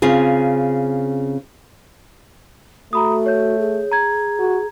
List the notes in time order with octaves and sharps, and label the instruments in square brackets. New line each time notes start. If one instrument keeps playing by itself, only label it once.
[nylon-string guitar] C#3 C4 F4 G#4
[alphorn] A3 [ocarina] F#4 [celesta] A#5 B5 D#6
[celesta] C#5 G6
[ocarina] G#4
[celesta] A#5 G#6
[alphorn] F#4